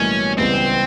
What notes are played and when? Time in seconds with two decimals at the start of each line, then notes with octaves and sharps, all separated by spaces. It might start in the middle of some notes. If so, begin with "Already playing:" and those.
Already playing: B1 A2 E3 G3 A#3 C#4
0.38 C#2 C#3 E3 G3 B3 C4